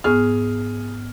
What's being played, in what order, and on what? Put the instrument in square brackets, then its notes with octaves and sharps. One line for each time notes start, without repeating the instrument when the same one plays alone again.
[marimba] G#2 B3 C#6 [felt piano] G#4 F6